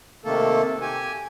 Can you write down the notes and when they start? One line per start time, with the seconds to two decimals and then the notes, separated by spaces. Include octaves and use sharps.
0.25 C3 D#3 A3 A#3 A4
0.82 G4 G#5